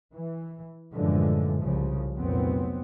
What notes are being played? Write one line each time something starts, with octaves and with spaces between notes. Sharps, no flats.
E3
F#2 A2 D3 E3 F3 G#3
C2 C#3 F3
F1 A#2 F#3 B3 C4